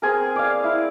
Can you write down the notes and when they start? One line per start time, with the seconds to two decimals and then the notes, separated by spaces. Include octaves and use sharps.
0.02 C4 G#4 A#4
0.36 D5 F5
0.64 E4